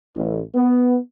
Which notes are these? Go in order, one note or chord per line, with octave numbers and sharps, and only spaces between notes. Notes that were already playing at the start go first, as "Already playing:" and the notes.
A1
B3